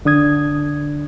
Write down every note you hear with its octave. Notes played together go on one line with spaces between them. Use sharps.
D3 D4 D#6 G#6